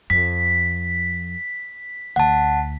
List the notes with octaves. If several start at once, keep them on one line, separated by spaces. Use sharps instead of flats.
F2 B6
D2 F#5 A5